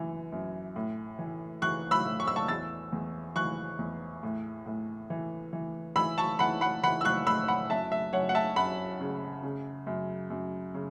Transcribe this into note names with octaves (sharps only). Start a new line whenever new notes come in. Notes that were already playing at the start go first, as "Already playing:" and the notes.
Already playing: F#2 E3
F#2
A2
E3
E3 C#6 F#6
B5 E6
A2
C#6
E6
A5 C#6
E2 E6 A6
E2
E3 C#6 F#6
E2
A2
A2
E3
E3
E3 B5 E6
A5 C#6
E3 F#5 B5
F#5 B5
E3 F#5 B5
E6
C#6 F#6
A2 B5 E6
F#5 B5
F#2 E5 A5
E5
F#2 C#5 F#5
F#5
E5 A5
F#2 F#5 B5
C#3
C#3
F#2
F#2
C#3